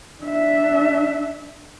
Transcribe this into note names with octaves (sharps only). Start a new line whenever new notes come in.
D4 E5